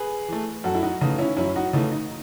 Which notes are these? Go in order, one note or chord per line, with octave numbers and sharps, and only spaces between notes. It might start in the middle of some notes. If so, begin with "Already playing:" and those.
Already playing: G#4 B4
E3 A3
F#2 F#4 A4
E4
D#4 F#4
C#3 E3 A3 D#4
C#4 E4
F#2 C#4 E4
D#4 F#4
C#3 E3 A3 D#4
D#4